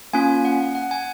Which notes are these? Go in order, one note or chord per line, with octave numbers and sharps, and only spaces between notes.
A#3 C#4 F4 G#5
F#5
F#5
G#5